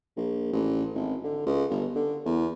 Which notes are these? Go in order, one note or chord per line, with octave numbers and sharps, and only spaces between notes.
A#1
A1
G#1
D3
C#2
G1
D3
E2